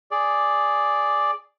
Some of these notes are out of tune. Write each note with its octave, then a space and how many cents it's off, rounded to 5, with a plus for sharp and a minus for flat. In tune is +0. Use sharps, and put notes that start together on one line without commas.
G#4 +0 D5 +0